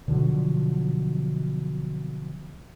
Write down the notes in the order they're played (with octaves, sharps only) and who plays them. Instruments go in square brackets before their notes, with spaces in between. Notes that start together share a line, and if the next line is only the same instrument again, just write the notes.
[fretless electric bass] B2 D3 F3 F#3